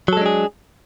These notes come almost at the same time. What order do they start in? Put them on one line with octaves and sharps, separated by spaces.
F#3 A4 G#3 D4 G#4